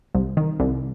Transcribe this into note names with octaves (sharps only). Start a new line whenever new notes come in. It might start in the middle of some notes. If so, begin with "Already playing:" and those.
C2
D#3
C2